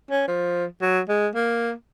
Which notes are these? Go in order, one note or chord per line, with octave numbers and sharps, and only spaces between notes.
C#4
F3
F#3
G#3
A#3